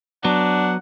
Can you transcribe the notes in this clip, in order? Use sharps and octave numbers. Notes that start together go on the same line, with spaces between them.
F#3 B3 D4 F#5